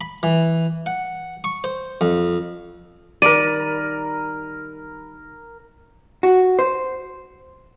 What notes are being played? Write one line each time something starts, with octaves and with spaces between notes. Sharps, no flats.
B5
E3
F#5
C#6
C5
F2
D#3 G3 A#4 D5 B5 D#7
F#4
C5